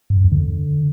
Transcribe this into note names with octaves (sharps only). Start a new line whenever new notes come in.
G2
F#2
F2
D3